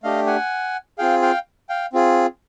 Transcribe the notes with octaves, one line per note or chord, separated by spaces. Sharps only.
A3 D4 G4 D#5 F5
F#5 G#5
C4 F4 G#4 F5 G5
F5 G5
F5 G5
C4 F4 G#4